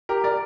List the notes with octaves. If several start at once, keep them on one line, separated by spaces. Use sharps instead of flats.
G4 A#4
A#4 D5